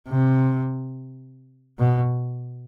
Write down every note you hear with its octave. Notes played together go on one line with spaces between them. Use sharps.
C3
B2